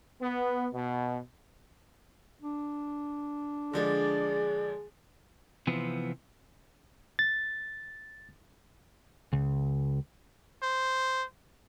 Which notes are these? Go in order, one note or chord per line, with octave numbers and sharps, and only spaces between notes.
B3
B2
D4
D3 F3 G#3 G#4 D5
C3 E3 F3 B3 C4
A6
C#2
C5